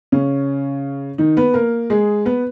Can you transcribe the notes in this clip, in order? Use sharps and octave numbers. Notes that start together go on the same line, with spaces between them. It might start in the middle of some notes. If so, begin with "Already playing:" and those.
C#3 C#4
D#3 D#4
B3 B4
A#3 A#4
G#3 G#4
B3 B4